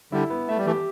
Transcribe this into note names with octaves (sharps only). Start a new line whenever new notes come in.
D3 G3 E4
B3
A3 E5
G3
E3 A3 G4